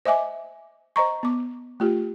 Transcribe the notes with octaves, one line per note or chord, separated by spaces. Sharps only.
C5 D#5 E5 G#5 D6
C5 D#5 A#5 C#6
B3 D6
A3 F4 G4